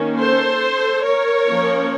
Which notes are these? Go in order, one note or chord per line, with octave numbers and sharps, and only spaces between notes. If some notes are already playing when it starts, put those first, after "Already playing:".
Already playing: D#3 A#3 C#4
A4 C5
A#4 C#5
F3 A#3 C#4